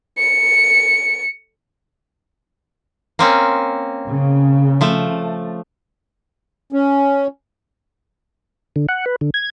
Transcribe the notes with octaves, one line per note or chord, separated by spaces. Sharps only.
C#7
A#3 C4 C#4
C#3
F3 A3
C#4
D3
F#5
B4
D3
G#6